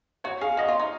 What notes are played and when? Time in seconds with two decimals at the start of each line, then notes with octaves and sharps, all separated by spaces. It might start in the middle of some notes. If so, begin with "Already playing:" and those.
0.24 F#4 C#5
0.41 G#4 F5
0.57 F#4 D#5
0.68 F4
0.80 D#4